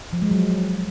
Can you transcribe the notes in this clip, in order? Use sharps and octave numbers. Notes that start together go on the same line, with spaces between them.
F3
G#3
F#3